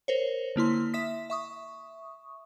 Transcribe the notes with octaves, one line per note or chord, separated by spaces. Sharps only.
A#4 C5 C#5
D3 A#3 E4 C6
E5 D#6 B6
E5 C#6 D#6